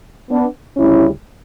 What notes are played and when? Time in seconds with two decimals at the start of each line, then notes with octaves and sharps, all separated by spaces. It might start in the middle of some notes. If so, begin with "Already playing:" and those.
0.30 B3 D4
0.77 D2 C#3 G3 C#4 E4